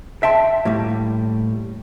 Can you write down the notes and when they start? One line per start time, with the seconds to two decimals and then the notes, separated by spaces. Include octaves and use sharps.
0.23 E5 G5 A5 C6
0.65 A2 G3 A3 A#3